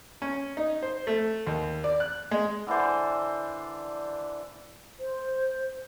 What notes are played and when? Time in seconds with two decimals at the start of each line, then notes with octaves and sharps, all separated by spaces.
0.22 C#4
0.57 D#4
0.83 C5
1.07 A3
1.47 D#2
1.84 D5
2.00 F#6
2.31 G#3
2.67 D3 E3 D4 C5
4.99 C5